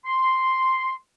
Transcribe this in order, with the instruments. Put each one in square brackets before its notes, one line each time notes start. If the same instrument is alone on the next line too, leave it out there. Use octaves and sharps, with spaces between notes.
[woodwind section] C6